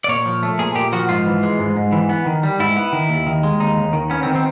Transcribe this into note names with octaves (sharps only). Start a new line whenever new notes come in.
D5
A#2 C#5
F3
A3
A#2 G#4
A#2 G4
F3 F#4
G#2 F4
E3
G#3
G#2
G#2
E3
B3
D#3
G3
G#2 E4
B3
D#3
D#2
D#3
G#3
D#2 D#4
D#2
D#3
B3 C#4
C4
D#3
C4